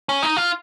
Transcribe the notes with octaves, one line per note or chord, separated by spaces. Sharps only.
C#4
D#4
F4